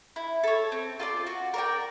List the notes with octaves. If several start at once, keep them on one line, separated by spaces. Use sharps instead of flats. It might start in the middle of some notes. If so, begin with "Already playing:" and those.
E4
A4 C#5
C4
F4 A4 D5
F#4
A#4 D5 G5